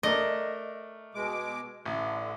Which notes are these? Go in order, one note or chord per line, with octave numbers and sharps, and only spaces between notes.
A3 D4 A#4 D#5
B2 G#3 D6
A1 D3